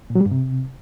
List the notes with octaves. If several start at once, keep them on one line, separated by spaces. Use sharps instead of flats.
A#2
F#3
G3
G2
C3